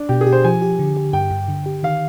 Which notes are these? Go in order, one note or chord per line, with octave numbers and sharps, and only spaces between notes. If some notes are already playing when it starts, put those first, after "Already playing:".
Already playing: D4
B2 G4
G#4
G4
C5
F3 G#5
G4
D3
G4
G2 G5
G2
D3
G4
D#3 F5